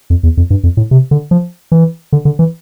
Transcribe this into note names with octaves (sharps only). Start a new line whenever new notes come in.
F2
E2
F2
G2
F2
A2
C3
D3
F3
E3
D3
D3
E3